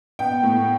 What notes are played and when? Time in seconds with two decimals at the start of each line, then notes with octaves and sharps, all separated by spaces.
0.19 B3 G5
0.43 A2